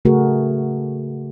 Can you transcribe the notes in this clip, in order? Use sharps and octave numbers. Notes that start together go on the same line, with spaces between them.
C#3 A3 F#4 G#4 A#4